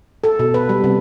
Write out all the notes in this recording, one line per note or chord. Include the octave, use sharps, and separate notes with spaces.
A4
B2
B4
G3
C3